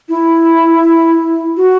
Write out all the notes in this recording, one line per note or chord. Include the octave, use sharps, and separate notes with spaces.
E4
F#4